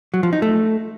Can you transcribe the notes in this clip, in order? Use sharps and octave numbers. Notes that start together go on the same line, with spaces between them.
F#3
F3
D#4
A3